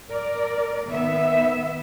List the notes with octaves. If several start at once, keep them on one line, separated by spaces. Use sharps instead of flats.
A#4 D5
D#3 B3 E5